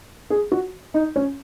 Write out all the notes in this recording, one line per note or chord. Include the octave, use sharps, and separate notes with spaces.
G#4
F#4
D#4
C#4